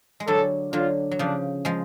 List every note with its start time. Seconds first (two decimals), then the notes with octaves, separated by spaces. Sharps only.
0.20 G#3
0.27 D3 F#3 A4
0.73 D3 F#3 F4
1.11 F#3
1.19 C#3 F3 D4
1.65 F3 G#3